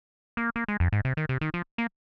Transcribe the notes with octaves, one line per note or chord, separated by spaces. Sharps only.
A#3
A#3
G#3
F2
G#2
C3
D#3
C3
D#3
F3
A#3